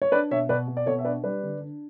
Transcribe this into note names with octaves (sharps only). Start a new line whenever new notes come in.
C#5
D4 B4 D5
B2 C#5 E5
B2 B4 D5
B2
D5
B2 A4 C#5
E5
D4 B4 D5
G3 B4 D5
D3
D4